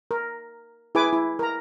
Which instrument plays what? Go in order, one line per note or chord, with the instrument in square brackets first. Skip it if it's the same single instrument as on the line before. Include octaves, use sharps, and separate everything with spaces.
[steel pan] A#4
E4 G#4 B4 G#5 D6
E4
A#4 A#5